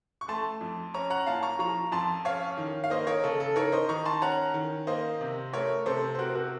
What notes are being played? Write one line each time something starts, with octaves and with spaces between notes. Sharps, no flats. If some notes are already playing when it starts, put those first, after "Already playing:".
C#6
A3 A5 C6
F2
C#4 A#5 C#6
F#5 A#5
A#2 F5 A5
A#5 C#6
F3 A#5 C#6
F2 A5 C6
C#4 C#5 F5
D#3
F5
A#3 C5 D#5
A#4 C#5
C#3 A4
A4
D#4 A#4 C#5
C5 D#5
D#3 A#5 C#6
A5 C6
C#4 F#5 A#5
D#3
A#3 C5 D#5
C3
A3 A#4 C#5
C3 A4 C5
C5
C4 F#4 A#4
F#4 A#4